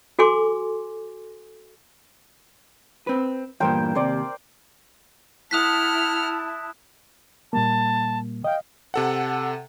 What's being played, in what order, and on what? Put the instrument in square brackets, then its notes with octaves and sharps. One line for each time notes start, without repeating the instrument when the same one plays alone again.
[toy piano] F#4 A4 G#5 C6 D6
[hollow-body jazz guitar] C4 B4
[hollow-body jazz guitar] E2 G2 A#2 [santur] A#4 C5 G5
[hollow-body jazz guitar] D#2 C3 [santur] C5 D5
[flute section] E4 A5 [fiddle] F#5 F6 [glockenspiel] D#6 F#6 B6
[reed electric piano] A#2 G3 A#3 [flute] A5
[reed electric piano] D#5 F5 [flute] G5
[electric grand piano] C3 A4 F#5